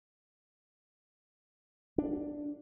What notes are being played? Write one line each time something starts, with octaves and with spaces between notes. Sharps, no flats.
D4